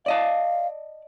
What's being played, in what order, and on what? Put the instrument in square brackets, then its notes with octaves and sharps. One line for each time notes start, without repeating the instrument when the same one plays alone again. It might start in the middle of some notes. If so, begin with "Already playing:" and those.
[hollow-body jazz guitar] D5 D#5 A5 [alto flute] F5